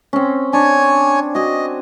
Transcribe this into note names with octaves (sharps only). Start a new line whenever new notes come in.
C4 C#4
D4 C#5 G#5
F#4 D#5 G#5